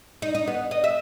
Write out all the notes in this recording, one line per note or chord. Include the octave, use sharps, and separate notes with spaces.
D#4
D#4
B3
D#5
E5